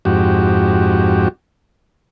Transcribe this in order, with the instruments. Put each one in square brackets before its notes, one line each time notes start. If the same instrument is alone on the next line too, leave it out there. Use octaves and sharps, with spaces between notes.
[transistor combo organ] F2 G#2 F#4 G4